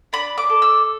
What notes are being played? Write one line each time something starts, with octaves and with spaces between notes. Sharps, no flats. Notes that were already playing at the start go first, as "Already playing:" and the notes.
D4 B5
D6
A4
E6